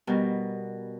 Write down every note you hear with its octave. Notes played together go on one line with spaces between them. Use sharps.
B2 G3 A#4